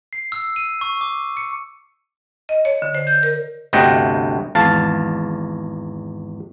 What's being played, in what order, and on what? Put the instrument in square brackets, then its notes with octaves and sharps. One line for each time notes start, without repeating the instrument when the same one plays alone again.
[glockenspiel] C7
E6
D#7
C#6
D6
C#7
[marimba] D#5
C#5
D3
C5
G6
A#4
[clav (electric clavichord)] G1 D2 C3 D#5 F#5 G5
G#1 E2 F5 A5